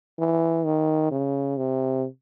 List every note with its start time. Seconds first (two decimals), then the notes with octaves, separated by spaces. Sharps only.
0.19 E3
0.65 D#3
1.11 C#3
1.57 C3